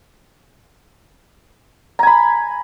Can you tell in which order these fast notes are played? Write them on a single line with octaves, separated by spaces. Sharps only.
A#5 G#5 B5